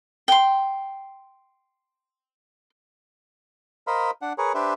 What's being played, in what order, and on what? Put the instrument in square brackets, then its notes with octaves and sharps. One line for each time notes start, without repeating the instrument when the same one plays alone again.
[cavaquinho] G5 C6
[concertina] A#4 C5 D#5 F5 B5
D4 F#5
G#4 A#4 B4 C#5
D4 G4 B4 C5 E5